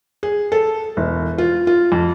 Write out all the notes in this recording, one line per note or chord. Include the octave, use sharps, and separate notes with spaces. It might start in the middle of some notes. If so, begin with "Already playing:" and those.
G#4
A4
E1
F4
F4
F2